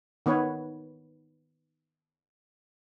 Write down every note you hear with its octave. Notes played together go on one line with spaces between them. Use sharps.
D#3 B3 B4 C#5